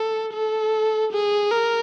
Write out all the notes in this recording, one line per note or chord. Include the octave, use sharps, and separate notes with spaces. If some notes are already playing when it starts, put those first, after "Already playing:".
Already playing: A4
A4
G#4
A#4